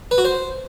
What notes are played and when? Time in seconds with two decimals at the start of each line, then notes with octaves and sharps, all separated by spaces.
0.11 B4
0.18 F#4
0.25 C5